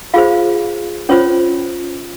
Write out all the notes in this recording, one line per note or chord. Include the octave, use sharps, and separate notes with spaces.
F4 G#4 C5 F5
C#4 F4 C5 C#5